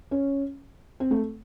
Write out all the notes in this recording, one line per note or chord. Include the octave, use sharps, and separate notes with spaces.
C#4
C4
A3